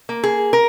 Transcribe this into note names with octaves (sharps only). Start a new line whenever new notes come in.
A#3
G#4
A#4